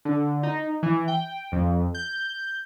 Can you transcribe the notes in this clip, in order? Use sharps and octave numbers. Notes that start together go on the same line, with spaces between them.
D3
D#4
E3
G5
F2
G6